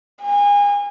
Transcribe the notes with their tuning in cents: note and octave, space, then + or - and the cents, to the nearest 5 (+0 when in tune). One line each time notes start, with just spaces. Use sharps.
G#5 -30